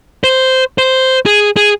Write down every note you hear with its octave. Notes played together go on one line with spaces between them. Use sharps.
C5
C5
G#4
G#4